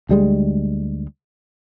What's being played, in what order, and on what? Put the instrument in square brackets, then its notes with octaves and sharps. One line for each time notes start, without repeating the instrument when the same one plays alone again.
[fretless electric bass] D2 G3 G#3